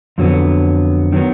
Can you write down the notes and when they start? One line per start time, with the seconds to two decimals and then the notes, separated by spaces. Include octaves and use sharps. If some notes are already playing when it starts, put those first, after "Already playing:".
0.18 F2 D3 F#3 B3
1.12 D#3 F#3 B3